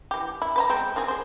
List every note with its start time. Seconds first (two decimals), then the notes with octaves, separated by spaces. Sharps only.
0.11 E3 G4
0.42 E4
0.56 B4 C5 A#5
0.69 G#3 B3 C4
0.96 D#3 C4 G#4
1.08 G#4 C5